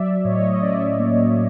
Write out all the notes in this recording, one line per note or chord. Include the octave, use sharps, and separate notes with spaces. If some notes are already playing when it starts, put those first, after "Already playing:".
Already playing: F#3 D5 E5
D5
A2 C#5 D#5
D#5
C#4 D5 E5
A#3